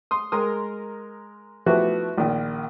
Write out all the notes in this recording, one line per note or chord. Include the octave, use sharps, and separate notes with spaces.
C6 D#6
G#3 A#4 C6 D#6
F3 A3 B3 E4 F#4 G4
A#1 D#3 F4